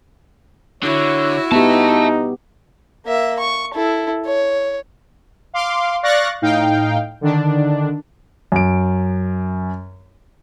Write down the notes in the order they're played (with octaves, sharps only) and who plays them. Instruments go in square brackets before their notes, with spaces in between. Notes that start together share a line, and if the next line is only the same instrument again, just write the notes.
[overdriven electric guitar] D3 [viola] E4 F#4 [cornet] C#5
[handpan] B3 G4 [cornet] D#4 [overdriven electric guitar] E5 A5
[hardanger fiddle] A#3 E5
C#6
E4 A4
C#5
[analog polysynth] F5 C6 D6
D5 F5 C#6 F#6 A6 A#6
A2 D#4 F5 G5
D3 D#3 D4
[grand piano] F#2 D7